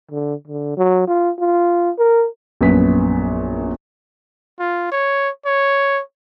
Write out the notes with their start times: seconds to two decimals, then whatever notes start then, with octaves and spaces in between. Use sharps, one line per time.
0.11 D3
0.47 D3
0.77 F#3
1.08 F4
1.39 F4
1.98 A#4
2.61 A#1 F#2 B3 B6
4.59 F4
4.92 C#5
5.46 C#5